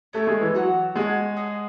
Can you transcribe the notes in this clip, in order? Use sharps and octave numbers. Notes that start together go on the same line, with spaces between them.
A3 C#4 E4 A4 C#5
G#3
E3
F#3 F#4 C#5 F#5 A5
G#3 G#4 C#5 F#5 A5
G#4 D#5 F#5